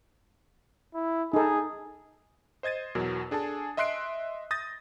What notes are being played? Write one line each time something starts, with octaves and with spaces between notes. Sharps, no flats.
E4
D#4 G#4 A4
C5 D#5 G#6 A6 D#7
E2 B2 F#3 A#4
D4 G#4 A4 G#5 A5
D#5 E5 C6 F#6 C7 D7
D#6 G6 A6 A#6